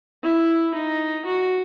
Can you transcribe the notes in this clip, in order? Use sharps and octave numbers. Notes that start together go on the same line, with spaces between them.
E4
D#4
F#4